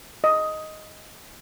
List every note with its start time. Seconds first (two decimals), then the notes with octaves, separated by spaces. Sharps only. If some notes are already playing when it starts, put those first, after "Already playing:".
0.24 D#5